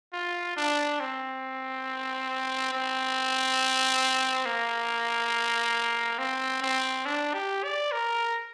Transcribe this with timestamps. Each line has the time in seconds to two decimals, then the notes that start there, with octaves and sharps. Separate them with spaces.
0.13 F4
0.57 D4
1.00 C4
2.72 C4
4.46 A#3
6.18 C4
6.62 C4
7.05 D4
7.34 G4
7.63 D5
7.91 A#4